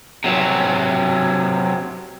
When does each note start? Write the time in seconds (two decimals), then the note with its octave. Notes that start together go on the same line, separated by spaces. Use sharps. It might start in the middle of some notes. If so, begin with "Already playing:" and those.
0.24 C3 F#3